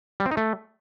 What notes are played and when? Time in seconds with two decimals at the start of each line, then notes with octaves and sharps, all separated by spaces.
0.20 G3
0.26 C4
0.31 D#4
0.37 A3